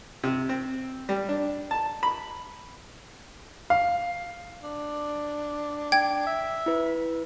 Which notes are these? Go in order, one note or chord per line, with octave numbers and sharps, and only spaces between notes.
C3
C4
G3
D4
A5
B5
F5
D4
G5 G#6
E5
E4 B4